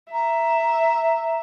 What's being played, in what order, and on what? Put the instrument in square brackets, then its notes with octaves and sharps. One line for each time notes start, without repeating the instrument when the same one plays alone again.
[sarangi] E5 [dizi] A#5